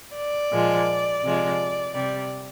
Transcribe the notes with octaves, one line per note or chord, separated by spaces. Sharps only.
D5
A#2 F3 G#3
C3 F3 G#3
C3 G3 D5